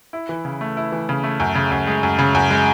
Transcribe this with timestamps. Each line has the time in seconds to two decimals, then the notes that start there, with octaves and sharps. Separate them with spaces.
0.13 E4
0.29 E3
0.45 C#3
0.61 A3
0.77 E4
0.92 E3
1.09 C#3
1.23 A3
1.40 F#2
1.55 C#3
1.72 F#2
1.87 G#3
2.03 F#2
2.19 C#3
2.35 F#2
2.51 G#3